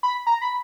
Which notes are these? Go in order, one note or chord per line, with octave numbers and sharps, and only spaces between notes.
B5
A#5
B5